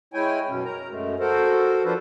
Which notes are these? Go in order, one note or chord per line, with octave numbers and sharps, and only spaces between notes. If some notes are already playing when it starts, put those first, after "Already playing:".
G#3 E4 C#5 G5 G#5
F#2 B2 C#4
A#4 A#5
F#2 G#3 A3
F#4 A4 A#4 C5
F3 D4 F4 A4 B4 C5